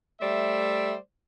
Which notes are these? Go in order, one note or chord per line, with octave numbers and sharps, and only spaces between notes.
G3 A3 C5 D5 E5